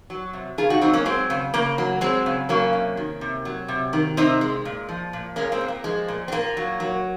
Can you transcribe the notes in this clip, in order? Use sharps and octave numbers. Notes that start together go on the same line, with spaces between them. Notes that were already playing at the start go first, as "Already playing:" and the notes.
F#3
C3
C#3 F4 G#4
D#4 F#4
F#3 C4 D#4
A#3 C#4
F#3 G#3 C4
C#3
C#3 A#3
F#3
F#3 G#3 C4
C#3
F#3 A#3 C#4
C3
D#3
C3
F#3
C3
D#3
C3 C4 D#4
G#3
A#2
F3
A#2
G#3 A#3 C#4
G#3 C4
A#2
A#3
F3 G#3
A#2
C4
A#2 A#3
F#3
F#3